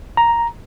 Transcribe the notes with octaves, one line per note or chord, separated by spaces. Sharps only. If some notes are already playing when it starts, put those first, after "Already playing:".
A#5